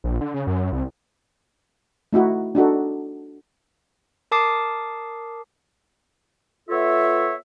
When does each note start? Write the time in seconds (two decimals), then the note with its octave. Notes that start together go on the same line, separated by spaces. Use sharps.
0.04 A#1
0.21 D3
0.34 C#3
0.47 F#2
0.72 C2
2.13 A3 D#4 E4 F#4
2.55 D4 D#4 F#4 A4
4.32 A#4 A5 D6 D#6 C7
6.69 B3 F4 A4 C#5 E5